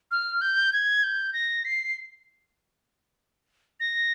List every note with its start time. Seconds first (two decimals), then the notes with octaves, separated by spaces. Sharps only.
0.11 F6
0.41 G6
0.73 G#6
1.03 G6
1.33 A#6
1.65 C7
3.80 A#6